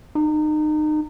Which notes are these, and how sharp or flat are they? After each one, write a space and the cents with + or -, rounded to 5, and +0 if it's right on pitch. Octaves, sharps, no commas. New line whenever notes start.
D#4 -30